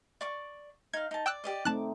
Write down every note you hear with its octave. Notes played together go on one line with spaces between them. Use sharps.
D5 C#6 D6
D#4 F5 G#6
D#4 A5
D5 G5 E6 F#6
G4 D5 D#5
A3 C4 D#4 A5 D6 F#6